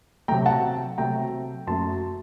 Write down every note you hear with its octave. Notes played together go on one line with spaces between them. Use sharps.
C3 F#3 A3 G5 A#5
F#5 A5
C3 F#3 A3 G5 A#5
F#2 F#3 A3 A5 C6